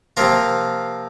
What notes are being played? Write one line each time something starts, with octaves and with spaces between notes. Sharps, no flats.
C3 F3 A#3 F4 A#4